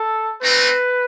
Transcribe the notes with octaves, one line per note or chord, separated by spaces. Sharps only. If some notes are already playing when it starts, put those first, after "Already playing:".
Already playing: A4
A3 C4 D#4 B4